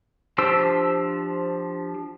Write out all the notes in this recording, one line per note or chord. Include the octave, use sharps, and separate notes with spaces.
F3 D4 G4 C5 E6